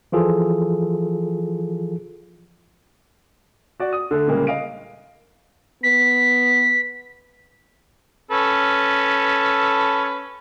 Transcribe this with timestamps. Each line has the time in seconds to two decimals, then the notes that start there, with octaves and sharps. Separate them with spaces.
0.12 E3 F3 F4 G#4 A4
3.80 F#4 D5
3.93 D#6
4.11 D3 A3 A4
4.27 A#2 C#3 G3 G#3 A#3
4.47 D#5 F5 D7
5.83 B3 B6
8.31 C#4 A4 B4